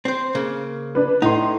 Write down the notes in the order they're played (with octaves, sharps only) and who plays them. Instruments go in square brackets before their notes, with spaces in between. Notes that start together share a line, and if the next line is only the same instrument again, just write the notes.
[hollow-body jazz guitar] C4 C5
C#3 A#3
[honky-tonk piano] D4 B4
[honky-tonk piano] A2 C6 [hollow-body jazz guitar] D#4